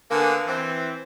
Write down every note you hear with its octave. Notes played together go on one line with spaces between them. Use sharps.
D3 A#3 B3 F5 G#5
E3 C4